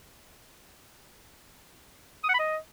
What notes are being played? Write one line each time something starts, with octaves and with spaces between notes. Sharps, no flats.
D#6
F#5
B5
D#5